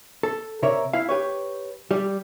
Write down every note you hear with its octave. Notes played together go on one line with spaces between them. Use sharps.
A4
C3 A#4 C#5 D5 E5
E4 F5
G4 B4 C#5
G3 G4 D5